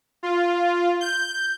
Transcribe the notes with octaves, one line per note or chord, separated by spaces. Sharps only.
F4
G6